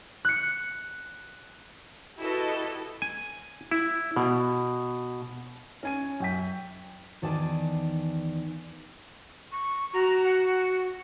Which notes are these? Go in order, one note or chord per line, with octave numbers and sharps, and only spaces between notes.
F#6 C#7
E4 F#4 G4 A4 B4 D#5
G#5
E4
B2
C#4 G#5 D#7
F#2 G5 B6
E2 D#3 D5 G#5 A5
C#6
F#4 A#5
F#5